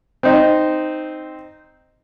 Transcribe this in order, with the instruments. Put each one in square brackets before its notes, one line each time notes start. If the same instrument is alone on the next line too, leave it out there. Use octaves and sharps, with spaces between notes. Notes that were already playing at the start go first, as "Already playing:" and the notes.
[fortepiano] C4 D#4